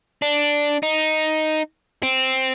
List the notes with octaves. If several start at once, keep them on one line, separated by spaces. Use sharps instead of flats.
D4
D#4
C4